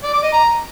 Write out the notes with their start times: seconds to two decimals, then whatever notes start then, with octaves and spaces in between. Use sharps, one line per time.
0.03 D5
0.13 D6
0.23 D#5
0.33 A#5